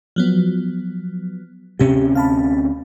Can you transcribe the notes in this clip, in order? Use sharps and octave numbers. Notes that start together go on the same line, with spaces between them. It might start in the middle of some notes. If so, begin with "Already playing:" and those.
F3 F#3 B3
D2 C3 C#4 G4
F5 A5 B5